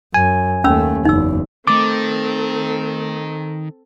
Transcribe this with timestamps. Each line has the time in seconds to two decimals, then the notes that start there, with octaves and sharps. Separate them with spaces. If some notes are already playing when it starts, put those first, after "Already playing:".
0.14 F#2 G#5
0.64 D#2 A3 C#4 B5 E6
1.05 F#1 E2 D#4 E6
1.67 D#3 A3 C4 A4 D6 A6